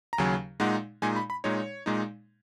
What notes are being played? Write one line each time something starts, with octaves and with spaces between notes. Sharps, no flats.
A#5
D#2 C#3 F#3 G#5
A#2 G#3 D#4 F#5
A#2 G#3 D#4 G#5
B5
B5
A#2 G#3 D#4 C#5
A#2 G#3 D#4